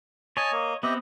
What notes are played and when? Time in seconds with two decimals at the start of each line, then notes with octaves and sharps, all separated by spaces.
0.37 C#5 D#5 G#5 A5
0.52 A#3
0.83 B3 C4 G4 D#5 E5